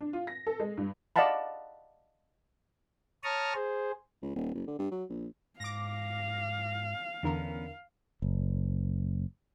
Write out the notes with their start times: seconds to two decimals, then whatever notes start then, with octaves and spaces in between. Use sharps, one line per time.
0.01 D4
0.13 F4
0.27 A#6
0.47 A4
0.60 G#3
0.77 G2
1.16 D5 D#5 F5 F#5 A5 B5
3.24 C#5 A5 A#5 C#6 D#6 F6
3.54 G#4 C5
4.22 C#2
4.35 D#1
4.55 F#1
4.67 D3
4.79 G2
4.91 F#3
5.09 A#1
5.60 G#2 F5 D6 A#6
7.23 E2 D3 E3 B3 C#4 A#4
8.22 F#1